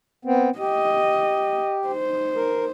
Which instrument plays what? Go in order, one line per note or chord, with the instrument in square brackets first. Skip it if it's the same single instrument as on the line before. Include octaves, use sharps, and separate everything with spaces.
[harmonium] B3 C4
[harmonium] G4 [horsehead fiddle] D#5
[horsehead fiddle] D#4 C5
[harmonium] A#4